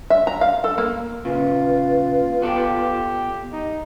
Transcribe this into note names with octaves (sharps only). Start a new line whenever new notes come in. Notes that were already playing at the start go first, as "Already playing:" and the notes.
E5
A#5
F5
A4
A#3
A#2 C#3 F4 B4
B3 G4 A4 D5
D#4